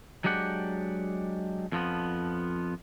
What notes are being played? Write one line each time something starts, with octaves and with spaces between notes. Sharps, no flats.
F#3 G#3 D4 G4 F#5
F2 F3 B3